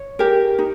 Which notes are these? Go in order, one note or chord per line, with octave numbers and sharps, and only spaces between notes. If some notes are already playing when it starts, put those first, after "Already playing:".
Already playing: C#5
G4 A#4
D#4